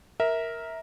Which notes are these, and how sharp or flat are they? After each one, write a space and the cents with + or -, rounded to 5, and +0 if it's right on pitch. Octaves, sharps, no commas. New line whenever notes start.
A#4 +0 E5 -20